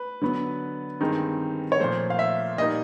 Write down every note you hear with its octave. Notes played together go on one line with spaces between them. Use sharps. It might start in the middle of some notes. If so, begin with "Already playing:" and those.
Already playing: B4
D3 F#3 B3
G2 D#3 G#3 C4 D#4
C#5
A#2 F3 A3 C5
F5
E5
A#2 G3 A#3 D#4 D#5